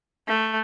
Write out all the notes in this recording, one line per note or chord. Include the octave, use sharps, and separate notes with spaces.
A3